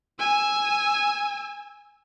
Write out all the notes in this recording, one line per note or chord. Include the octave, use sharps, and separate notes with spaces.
G#5 E6